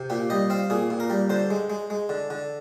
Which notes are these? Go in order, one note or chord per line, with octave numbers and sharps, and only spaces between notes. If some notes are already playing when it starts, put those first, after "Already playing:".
Already playing: C3
A#2 G4
G3 D#5
C4 F5
A#2 G#4
A#2
A#4
G3
D3 C5
G#3
G#3
G#3
D3
D3